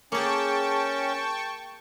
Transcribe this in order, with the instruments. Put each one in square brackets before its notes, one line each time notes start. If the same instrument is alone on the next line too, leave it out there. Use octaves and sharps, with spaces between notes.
[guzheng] A#3 G#4 [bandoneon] C#4 [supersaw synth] G5 A5 C#6